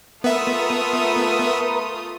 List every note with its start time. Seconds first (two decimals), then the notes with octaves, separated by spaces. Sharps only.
0.24 A3 B3 F4 A#4 B4 E5 D#6